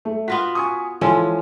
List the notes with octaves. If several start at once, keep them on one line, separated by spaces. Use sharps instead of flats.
A3
B3 F4 F#4 B6
G#5 C#6 D#6
E3 F3 G#3 C#4 A4 G#5